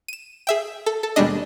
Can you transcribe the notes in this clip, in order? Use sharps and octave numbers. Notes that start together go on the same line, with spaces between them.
D#7 E7
G#4 E5 G5
A4
A4
D#2 B2 G3 G#3 D4 D#5